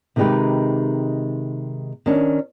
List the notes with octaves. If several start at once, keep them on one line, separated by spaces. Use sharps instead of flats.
C3 D#3 G#3 D#4 G4 B4
D#3 C#4 D4